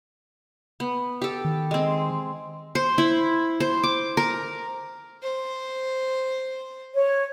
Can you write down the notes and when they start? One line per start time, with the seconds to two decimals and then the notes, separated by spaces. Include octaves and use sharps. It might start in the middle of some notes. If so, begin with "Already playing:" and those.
0.80 B3
1.22 G4 A4
1.45 D#3
1.71 G#3 C4
2.75 C5
2.98 E4
3.60 C5
3.83 D6
4.17 A#4
5.23 C5
6.94 C#5